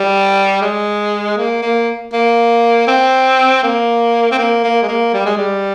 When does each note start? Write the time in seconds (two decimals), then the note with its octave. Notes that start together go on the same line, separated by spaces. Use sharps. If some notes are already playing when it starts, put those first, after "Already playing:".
Already playing: G3
0.62 G#3
1.37 A#3
1.62 A#3
2.13 A#3
2.88 C4
3.64 A#3
4.32 C4
4.39 A#3
4.64 A#3
4.83 G#3
4.89 A#3
5.14 G3
5.26 G#3
5.38 G3